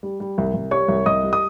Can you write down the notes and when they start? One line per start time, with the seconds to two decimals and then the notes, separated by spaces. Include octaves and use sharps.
0.03 G3
0.20 G3
0.38 C2
0.54 C2
0.71 G3 C#5 C#6
0.88 C2
1.06 C2 D#5 D#6
1.23 G3
1.33 D#6